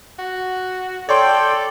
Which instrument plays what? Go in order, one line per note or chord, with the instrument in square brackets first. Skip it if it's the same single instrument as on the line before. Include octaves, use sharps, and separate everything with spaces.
[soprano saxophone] F#4
[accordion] A4 G5 [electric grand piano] C#5 C6 [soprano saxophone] D5